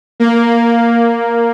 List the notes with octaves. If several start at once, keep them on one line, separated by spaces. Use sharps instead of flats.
A#3